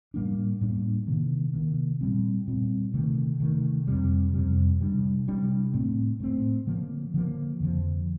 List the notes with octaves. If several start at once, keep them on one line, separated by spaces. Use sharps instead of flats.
A2 G3 A#3 D4
A2 G3 A#3 D4
C3 D#3 A#3
C3 D#3 A#3
A#2 G3 C4
A#2 G3 C4
C3 D#3 A3
C3 D#3 A3
F2 C3 G3
F2 C3 G3
C3 G3 D4
C3 G3 D4
A2 A3 C4
A2 A3 C4
D3 F3 A#3
D3 F3 A#3
F2 D3 F3